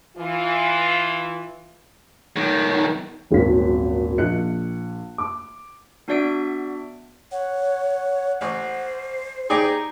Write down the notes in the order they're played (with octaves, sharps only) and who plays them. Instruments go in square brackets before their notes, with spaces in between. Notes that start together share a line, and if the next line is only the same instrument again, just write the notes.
[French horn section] E3 F4
[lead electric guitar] B1 D#3
[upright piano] D#1 G#1 F#3 C4 B6
A#1 D#5 F#6 C#7
D6
[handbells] B3 D4 F#4 D5 E5 D7
[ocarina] C#5 [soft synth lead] F#5
[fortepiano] A1 [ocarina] C5
[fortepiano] D#4 G4 D5 [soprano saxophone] G#4 [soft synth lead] A#5